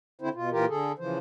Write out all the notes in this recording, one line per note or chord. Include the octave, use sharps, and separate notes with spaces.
D3 C4 E4 C5
B2 F4
A#2 E3 F4 G4 A#4
D3 G#4 A4
C#3 E3 F3 C5